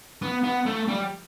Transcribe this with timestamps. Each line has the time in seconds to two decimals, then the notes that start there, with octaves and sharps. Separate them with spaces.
0.22 B3
0.44 B3
0.66 A3
0.88 G3